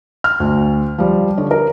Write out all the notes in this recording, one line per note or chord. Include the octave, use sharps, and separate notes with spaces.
F6
D2
F3 G3
D3 C#5
A#4